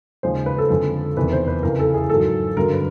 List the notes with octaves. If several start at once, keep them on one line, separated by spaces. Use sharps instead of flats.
D#2 C#3 F3 G#3 C5
B4
A4
F2 D3 F3 G#3 A4
E2 C3 D#3 B4
C5
B4
F2 C#3 E3 A#4
A4
G#4
G#2 D#3 F#3 A4
G2 D3 F#3 A#4
B4